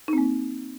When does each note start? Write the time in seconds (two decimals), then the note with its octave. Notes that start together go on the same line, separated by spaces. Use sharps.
0.08 D#4
0.13 C4
0.18 A#3